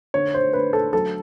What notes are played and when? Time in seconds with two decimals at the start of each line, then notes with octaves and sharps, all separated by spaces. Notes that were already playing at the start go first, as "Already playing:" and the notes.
0.14 D3 C#5
0.34 C5
0.53 D3 B4
0.73 A4
0.93 F#3 A4